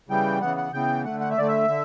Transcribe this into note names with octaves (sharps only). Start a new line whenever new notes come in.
C#3 E3 G3 B3 G5
C#3 E3 B3 F#5
F#5
C#3 E3 B3 G5
D3 A3 F#5
F#5
E5
D3 A3 D5
E5
D3